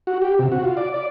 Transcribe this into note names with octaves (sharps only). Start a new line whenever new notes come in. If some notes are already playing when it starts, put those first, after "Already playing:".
F#4
G4
C3
F#4
F4
D5
D5